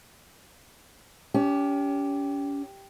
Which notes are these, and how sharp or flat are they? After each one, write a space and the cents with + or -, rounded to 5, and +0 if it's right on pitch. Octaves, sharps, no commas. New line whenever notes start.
C#4 +35 G4 +0